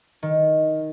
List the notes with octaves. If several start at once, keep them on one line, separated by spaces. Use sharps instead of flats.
D#3